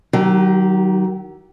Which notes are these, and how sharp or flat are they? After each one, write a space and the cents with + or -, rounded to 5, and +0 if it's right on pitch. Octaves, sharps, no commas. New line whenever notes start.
D#3 +0 F#3 +30 G4 -10